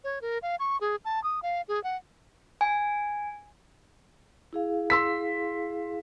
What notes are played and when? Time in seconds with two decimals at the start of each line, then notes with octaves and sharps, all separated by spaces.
0.04 C#5
0.22 A#4
0.42 F5
0.60 C#6
0.81 G#4
1.05 A5
1.24 D#6
1.42 F5
1.68 G#4
1.84 F#5
2.61 G#5
4.53 E4 G#4 F5
4.90 C6 E6 B6